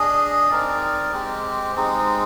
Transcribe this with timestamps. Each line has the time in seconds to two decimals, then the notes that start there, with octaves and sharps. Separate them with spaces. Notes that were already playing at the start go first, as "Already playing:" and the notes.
Already playing: D4 G#4 D#5
0.49 C4 D#4 A#4 D5
1.12 G#3 C4 G4
1.75 G#3 C4 D#4